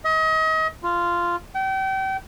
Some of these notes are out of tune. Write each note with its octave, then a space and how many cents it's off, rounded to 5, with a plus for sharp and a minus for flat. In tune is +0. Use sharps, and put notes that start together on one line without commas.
D#5 +35
F4 -10
G5 -35